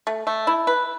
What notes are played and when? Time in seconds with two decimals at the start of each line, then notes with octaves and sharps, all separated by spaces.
0.07 A3
0.27 A3
0.47 E4
0.67 B4